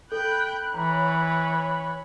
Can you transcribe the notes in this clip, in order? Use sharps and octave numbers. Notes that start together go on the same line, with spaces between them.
A4 G5 B5 F#6
E3 C#5 A#5 B5 C#6